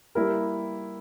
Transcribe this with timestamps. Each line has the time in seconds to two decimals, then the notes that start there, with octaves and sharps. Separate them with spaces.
0.15 G3 A#3 E4 G4 A#4